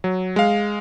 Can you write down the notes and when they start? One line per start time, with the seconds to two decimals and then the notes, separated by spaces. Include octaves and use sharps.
0.04 F#3
0.36 G#3 F5